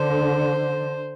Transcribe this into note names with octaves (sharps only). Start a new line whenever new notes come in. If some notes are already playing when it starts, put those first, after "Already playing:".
Already playing: D3 C5